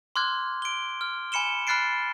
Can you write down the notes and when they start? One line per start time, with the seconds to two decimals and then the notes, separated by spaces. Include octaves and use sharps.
0.16 C6 D6 F6 F#6 G#6
0.62 D7 G7
1.01 F6
1.32 G#5 B5 C#7 E7 G7
1.67 B5 F6 F#6 A6 C7 D7